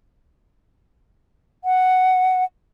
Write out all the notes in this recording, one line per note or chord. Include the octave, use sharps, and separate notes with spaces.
F#5